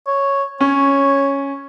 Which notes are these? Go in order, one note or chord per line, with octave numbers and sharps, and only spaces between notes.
C#5
C#4 C#5